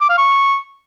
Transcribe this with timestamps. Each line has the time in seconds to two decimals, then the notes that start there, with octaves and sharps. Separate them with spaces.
0.01 D6
0.09 F5
0.18 C#6